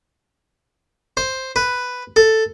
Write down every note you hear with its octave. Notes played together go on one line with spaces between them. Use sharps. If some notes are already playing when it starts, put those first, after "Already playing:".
C5
B4
A4